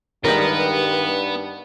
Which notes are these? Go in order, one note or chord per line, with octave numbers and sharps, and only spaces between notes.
G2 D#3 G3 G#3 B3 D#4 A#4